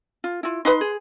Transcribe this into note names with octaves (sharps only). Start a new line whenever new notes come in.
F4
E4 F4
D#4 B4 F#5 C6
G#4